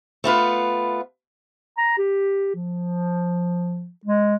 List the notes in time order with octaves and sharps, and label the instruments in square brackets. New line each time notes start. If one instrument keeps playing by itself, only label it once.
[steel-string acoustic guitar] A3 B3 F4 B4
[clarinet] A#5
G4
F3
G#3